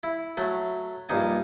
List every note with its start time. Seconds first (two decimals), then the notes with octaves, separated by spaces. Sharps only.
0.03 E4
0.37 F#3 A3
1.09 A#1 G2 D#4 G#5